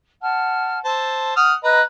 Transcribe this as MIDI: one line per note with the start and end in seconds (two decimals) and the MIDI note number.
0.21 0.79 78
0.21 0.79 81
0.21 0.79 89
0.85 1.35 72
0.85 1.35 81
0.85 1.49 88
1.37 1.54 78
1.37 1.54 87
1.37 1.54 89
1.64 1.81 71
1.64 1.81 75
1.64 1.81 82
1.64 1.81 89
1.64 1.81 90